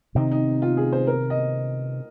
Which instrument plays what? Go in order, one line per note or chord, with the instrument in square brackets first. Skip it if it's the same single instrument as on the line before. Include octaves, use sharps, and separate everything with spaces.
[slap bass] C3 D#3 C4 [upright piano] D#4
[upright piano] D#4
F4
G#4
C5
A#4
D#5